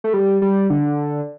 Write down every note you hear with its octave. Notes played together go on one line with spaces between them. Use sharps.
A3
G3
G3
D3